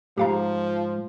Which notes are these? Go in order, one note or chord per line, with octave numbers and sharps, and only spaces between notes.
G#2 F3 G4 F5 A#5